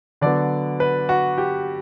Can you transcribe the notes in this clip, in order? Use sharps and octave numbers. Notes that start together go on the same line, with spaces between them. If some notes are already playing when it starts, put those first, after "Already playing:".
D3 F#3 B3 D5
B4
F#4
G4